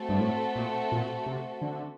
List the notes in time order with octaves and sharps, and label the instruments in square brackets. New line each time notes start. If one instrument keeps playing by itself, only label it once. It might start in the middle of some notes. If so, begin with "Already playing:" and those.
Already playing: [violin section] A3 C4 F#4 A4
[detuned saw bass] G2
A2
A#2
A#2
C3
D3